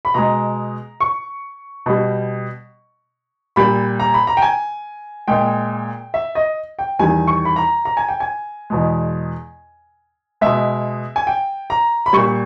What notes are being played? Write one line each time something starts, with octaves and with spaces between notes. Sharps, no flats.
B5
B2 G#3 A#5
C#6
B2 G3
A#2 G3 B5
A#5
B5
A#5
G5
G#5
A#2 G#3 G5
E5
D#5
G5
E2 D#3 G3 G#5
C#6
B5
A#5
A#5
G#5
G5
G#5
E2 B2 G#3
B2 G#3 E5
G#5
G5
A#5
B5
A#2 G3 C#6